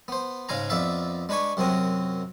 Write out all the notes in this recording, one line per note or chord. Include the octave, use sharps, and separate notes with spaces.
B3 C5
G#2 C#3 G#3 F5 G#5 A#5
F2 B3 D5 E5 F5
G#3 D4 B4 G#5 C#6
F#2 C3 F#3 C4 A#4 D#6